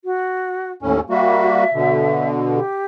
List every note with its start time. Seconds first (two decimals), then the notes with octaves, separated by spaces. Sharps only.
0.05 F#4
0.82 D#2 A2 C#4 A4
1.10 G3 A#3 F#4 E5
1.74 B2 D3
2.55 G4